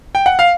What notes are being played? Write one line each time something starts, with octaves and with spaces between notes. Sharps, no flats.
G5
F#5
F5